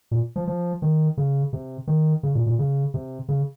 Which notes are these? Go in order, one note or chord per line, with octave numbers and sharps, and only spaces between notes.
A#2
F3
F3
D#3
C#3
C3
D#3
C#3
A#2
A#2
C#3
C3
C#3